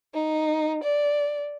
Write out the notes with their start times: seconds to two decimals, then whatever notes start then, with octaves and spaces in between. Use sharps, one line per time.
0.14 D#4
0.84 D5